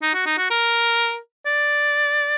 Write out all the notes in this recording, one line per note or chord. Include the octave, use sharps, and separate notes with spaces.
D#4
F#4
D#4
F#4
A#4
D5